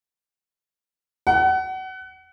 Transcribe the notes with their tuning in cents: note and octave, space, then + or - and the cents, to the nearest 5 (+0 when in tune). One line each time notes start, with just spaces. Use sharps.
F#5 +30